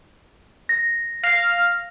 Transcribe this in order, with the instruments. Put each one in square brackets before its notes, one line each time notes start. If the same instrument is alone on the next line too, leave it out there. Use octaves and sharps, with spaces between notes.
[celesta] A#6
[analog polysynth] F5 [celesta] A#6